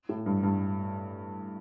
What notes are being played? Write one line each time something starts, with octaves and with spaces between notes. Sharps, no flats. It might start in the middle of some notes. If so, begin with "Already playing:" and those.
A2
G2
G2